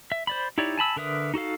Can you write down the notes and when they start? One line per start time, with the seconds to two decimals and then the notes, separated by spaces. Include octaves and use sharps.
0.12 E5
0.27 C5 D5 B5
0.58 D#4 E4 G4 C#5 D5
0.78 G#5 A5 B5 E6
0.96 D3 A#4 B4 E5 D#6
1.34 D#4 F#4 A4 F5